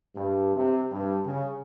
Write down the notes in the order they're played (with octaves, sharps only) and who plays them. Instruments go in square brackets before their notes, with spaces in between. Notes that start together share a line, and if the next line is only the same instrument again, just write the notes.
[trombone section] G2
C3
G2
C#3